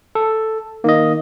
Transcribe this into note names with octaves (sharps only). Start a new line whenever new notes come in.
A4
D#3 A#3 D#5